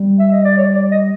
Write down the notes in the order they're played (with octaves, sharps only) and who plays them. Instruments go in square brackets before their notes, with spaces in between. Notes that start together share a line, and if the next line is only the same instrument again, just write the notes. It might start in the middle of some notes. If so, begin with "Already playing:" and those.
Already playing: [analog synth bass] G3
[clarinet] E5
D#5
D5
C#5
D5
D#5